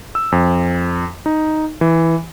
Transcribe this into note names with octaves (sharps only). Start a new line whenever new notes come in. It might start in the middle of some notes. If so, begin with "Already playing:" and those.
E6
F2
D#4
E3